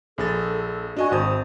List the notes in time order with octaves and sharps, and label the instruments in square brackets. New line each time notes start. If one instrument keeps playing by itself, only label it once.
[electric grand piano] A#1 G#4 A6 [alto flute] A4
[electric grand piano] D4 D#5 G#5 [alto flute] F#4
[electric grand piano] G#1 A5 D#6 [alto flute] C5